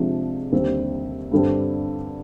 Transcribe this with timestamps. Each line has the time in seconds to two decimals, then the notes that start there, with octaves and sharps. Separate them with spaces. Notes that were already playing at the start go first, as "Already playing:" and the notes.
Already playing: C3 F3 G#3 D4
0.52 D#2 D3 G3 C4
1.32 G2 D3 G3 C4 G4